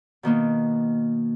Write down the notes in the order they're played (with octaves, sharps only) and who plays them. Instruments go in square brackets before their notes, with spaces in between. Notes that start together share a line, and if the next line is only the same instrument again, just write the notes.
[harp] B2 D#3 A#3 B3